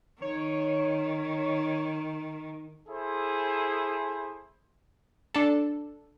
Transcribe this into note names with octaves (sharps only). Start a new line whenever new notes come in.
D#3 C#5
E4 G#4 A4 C5
D4 A4